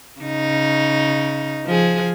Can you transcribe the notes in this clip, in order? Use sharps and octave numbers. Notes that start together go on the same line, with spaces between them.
C#3 D#4
F3 G#4